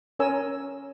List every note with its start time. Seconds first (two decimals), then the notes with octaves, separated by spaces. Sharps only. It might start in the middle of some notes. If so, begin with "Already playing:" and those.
0.19 C#4 A#4 C#5 G#5 E6